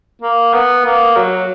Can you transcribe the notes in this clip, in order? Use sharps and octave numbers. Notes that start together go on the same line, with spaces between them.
A#3
B3
A#3
F#3